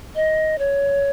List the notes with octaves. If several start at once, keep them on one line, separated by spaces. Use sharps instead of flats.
D#5
C#5